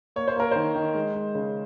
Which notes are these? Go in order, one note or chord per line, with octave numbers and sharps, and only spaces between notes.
A#3 C#5
C5
A#3 A#4
D#3 C5
D#3
G#3
G#3
C#3